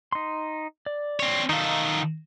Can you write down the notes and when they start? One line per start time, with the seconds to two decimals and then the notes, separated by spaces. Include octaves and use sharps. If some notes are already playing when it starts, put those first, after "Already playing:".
0.12 D#4 C6
0.86 D5
1.20 C4 C#5
1.49 D#3 D#4 A4 F5